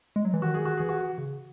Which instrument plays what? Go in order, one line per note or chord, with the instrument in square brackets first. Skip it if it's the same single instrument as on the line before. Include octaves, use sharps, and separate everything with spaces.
[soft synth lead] G#3
F#3
E3
[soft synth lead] D#3 [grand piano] F#4
[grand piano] G#4
F#4
[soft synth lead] E3 [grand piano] G#4
[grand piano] F#4
[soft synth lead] C#3